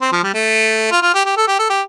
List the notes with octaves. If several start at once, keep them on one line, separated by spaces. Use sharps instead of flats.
C4
F3
G3
A3
F4
F4
G4
G4
A4
G4
A4
G4